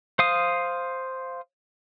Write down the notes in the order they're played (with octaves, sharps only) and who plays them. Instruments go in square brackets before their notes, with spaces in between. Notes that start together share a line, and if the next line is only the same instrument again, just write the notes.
[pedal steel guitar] C5 F5 D#6